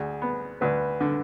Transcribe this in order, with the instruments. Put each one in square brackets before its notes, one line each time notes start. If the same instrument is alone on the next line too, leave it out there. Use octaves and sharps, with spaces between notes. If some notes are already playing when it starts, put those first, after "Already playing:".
Already playing: [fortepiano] D2 [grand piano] G#4
[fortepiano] B3
[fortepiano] D2 [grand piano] B4
[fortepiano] D3